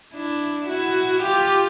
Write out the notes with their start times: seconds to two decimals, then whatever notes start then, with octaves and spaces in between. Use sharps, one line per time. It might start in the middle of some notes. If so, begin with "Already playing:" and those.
0.14 D4 E4
0.68 E4 F#4
1.23 F4 G4